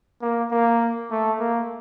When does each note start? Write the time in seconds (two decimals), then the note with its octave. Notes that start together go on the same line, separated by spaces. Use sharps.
0.22 A#3
0.51 A#3
1.11 A3
1.40 A#3